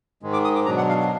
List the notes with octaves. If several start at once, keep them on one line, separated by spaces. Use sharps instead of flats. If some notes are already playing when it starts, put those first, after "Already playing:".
G#2 D#3 G#3
D6
D#6
D6
B2 F#3 D4 A#5
F#5
F5
F5